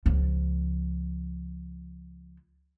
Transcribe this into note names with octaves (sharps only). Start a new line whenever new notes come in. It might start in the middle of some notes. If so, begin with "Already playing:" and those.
C#2 F3